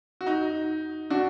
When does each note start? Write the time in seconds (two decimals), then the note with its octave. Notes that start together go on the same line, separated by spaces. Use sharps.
0.21 F#4
0.27 D#4
1.10 D4 F#4